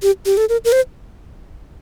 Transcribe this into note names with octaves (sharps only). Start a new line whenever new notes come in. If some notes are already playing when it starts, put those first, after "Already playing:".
G4
G4
A4
A#4
A#4
C5